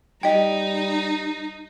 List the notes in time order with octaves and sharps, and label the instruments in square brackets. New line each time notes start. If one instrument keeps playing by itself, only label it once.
[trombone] G3 [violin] D#4 [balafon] D#5 G5